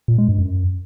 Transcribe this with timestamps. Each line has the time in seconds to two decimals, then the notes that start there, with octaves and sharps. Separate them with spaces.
0.08 A#2
0.18 G#3
0.28 G2
0.38 F#2